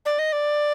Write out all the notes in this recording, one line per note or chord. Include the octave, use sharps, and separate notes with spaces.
D5
D#5
D5